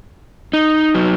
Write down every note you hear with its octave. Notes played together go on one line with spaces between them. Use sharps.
D#4
F#3